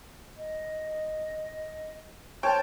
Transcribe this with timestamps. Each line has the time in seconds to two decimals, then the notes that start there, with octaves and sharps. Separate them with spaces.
0.37 D#5
2.43 A#4 C5 C#5 G5 A5